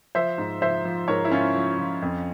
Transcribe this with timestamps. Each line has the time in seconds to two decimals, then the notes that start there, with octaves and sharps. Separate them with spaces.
0.15 F3 C5 E5
0.38 G#2
0.62 F3 C5 E5
0.85 F3
1.08 G#2 A#4 C#5
1.25 E4
1.31 G#2 C#4 F4
1.55 F3
1.79 F3
2.02 F2